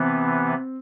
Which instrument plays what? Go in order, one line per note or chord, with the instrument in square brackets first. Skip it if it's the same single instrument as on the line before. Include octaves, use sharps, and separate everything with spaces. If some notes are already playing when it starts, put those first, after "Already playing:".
Already playing: [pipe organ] C3 E3 B3 [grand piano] C4